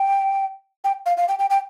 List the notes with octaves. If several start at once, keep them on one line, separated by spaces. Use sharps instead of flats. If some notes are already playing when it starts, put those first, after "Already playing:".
Already playing: G5
G5
F5
F5
G5
G5
G5